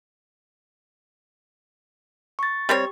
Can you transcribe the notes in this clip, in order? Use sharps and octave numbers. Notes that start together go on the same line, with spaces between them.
C#6 A6
G3 C4 G4 C#5